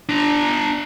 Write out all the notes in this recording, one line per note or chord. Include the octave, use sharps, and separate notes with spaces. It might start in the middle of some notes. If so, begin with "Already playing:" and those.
D4 A#5